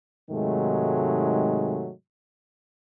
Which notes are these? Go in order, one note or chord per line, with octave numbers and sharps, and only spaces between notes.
G#2 C3 D#3 F#3 G#3 A3